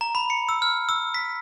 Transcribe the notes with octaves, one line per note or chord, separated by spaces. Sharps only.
A#5
B5
C#7
E6
F6
E6
B6